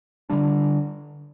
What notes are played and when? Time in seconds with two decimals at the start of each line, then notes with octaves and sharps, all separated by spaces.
0.30 D3 G3 D4